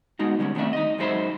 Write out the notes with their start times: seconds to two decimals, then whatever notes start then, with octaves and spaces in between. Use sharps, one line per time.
0.19 G#3 B3 D#4 F#4
0.39 D3 G3 G#3 C#4
0.55 D#3 A3 C4 D4 E5
0.73 D#4 D#5
0.98 F#2 G#3 D#4 C5 E5 B5